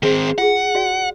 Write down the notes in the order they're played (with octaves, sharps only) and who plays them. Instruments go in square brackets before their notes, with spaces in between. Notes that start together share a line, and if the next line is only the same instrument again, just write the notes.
[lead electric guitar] D#3 C4 [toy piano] G#4
[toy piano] F4 G#4 [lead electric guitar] F#5
[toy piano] F#4 D5 F5